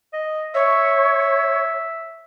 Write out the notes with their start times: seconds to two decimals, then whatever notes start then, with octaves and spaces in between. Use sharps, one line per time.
0.13 D#5
0.55 C#5 E5